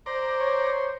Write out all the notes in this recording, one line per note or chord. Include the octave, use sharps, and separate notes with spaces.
C5 D5 A#5 C6
C#5